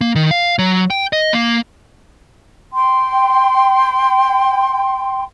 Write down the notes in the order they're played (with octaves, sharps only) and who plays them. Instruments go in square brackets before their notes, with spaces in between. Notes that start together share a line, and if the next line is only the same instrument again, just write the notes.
[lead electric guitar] A#3
D#3
F5
F#3
G5
D#5
A#3
[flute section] G5 C6